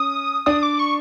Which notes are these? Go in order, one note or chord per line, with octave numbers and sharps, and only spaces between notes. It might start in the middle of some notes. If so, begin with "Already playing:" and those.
Already playing: C#4 D#6
D4 D5 D#6
D6
C#6